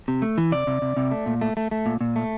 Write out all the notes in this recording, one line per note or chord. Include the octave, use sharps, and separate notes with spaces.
C3
A3
E3
C3 D5
C3
C3
C3
A3
A#2
A3
A3
A3
A#2
A#2
A3